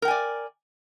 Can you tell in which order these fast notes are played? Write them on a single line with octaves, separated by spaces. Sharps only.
A#4 G5 G#5 D5